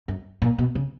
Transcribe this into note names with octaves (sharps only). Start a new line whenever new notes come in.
F#2
A#2
B2
C#3